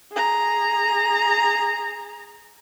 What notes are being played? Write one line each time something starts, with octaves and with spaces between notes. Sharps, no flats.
G#4 A#5